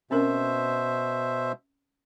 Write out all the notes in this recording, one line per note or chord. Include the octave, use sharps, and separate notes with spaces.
B2 C4 C#4 A#4 C5 E5